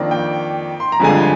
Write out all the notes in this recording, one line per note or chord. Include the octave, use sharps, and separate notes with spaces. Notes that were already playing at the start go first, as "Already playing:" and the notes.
Already playing: F2 D#3 A#3 D4
G5
C6
A#5
G1 F2 D3 G#3 G#5
G5